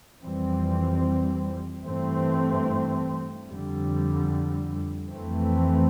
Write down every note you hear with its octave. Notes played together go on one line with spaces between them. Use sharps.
F2 E3 G3 C4
G2 E3 A3 C4
F2 D3 G3
F2 E3 A3 C4